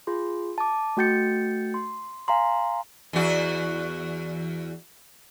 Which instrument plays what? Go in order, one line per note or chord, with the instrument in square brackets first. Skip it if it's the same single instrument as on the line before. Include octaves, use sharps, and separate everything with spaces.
[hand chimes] F4 G#4 C6
A5 D6
A3 F#4 G5 G6 A6 C#7
C6
F5 G#5 A#5 C6
[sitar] E2 F#4